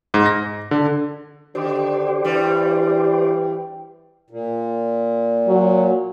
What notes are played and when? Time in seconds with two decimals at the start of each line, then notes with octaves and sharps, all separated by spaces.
0.14 G#2
0.26 A#6
0.71 D3
1.55 D3 D#3 G4 C5 D5
2.24 G2 E3 G3
4.30 A#2
5.48 F#3